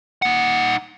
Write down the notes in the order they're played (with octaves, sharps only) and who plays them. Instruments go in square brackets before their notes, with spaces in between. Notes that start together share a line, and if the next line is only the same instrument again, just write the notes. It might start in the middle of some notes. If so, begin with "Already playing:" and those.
[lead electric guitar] D#4 F#5